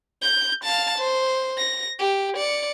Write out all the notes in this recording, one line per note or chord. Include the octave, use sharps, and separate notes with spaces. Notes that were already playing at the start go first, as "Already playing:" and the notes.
G6
F5 A5
C5
A#6
G4
D5 C#7